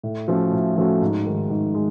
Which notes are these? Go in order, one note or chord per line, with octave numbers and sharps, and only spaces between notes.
A2
F3 A3 C#4 F#4
A2
F3 A3 C#4 F#4
G#2
D#3 G#3
G#2
G#3